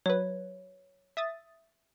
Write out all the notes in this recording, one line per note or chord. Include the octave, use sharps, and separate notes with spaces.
F#3 B4 C#5
E5 D#6 A6